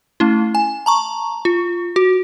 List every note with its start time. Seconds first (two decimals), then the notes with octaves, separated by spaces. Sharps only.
0.20 A3 C#4 E4
0.55 G#5
0.86 A5 A#5 C#6
1.45 F4
1.96 F#4